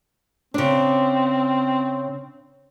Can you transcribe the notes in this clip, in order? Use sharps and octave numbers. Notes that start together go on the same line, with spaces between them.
C#3 C4 D4